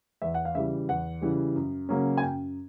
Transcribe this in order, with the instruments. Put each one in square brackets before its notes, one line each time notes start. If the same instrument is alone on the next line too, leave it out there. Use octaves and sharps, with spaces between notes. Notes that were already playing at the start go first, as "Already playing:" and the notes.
[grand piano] E2 E5
F#5
F5
C#3 E3 G3 E5
E2 F#5
C#3 E3 G3
F#2
C#3 F#3 A#3 C#4
G#5
F#2 G5